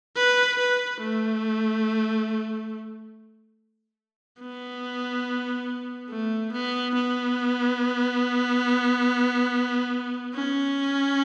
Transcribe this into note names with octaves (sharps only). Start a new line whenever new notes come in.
B4
B4
A3
B3
A3
B3
B3
C#4